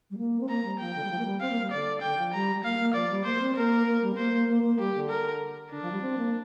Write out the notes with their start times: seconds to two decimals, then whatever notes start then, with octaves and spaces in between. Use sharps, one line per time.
0.10 G3
0.17 A#3
0.40 C4
0.49 A#3 A#5
0.64 G3
0.79 F3 G5
0.95 D3
1.03 G3
1.10 F3
1.18 A#3
1.25 G3
1.41 C4 F5
1.51 A#3
1.61 G3
1.71 D3 D5
2.01 D3 G5
2.17 F3
2.33 G3 A#5
2.55 G3
2.64 A#3 F5
2.78 A#3
2.94 F3 D5
3.09 G3
3.24 A#3 C5
3.36 A#3
3.40 C4
3.55 A#3 A#4
3.86 A#3
4.02 G3
4.13 C4
4.17 A#3 C5
4.33 A#3
4.48 A#3
4.63 A#3
4.79 G3 G4
4.94 D3
5.09 A#4
5.71 D3 D4
5.81 F3
5.91 G3
6.01 C4
6.17 A#3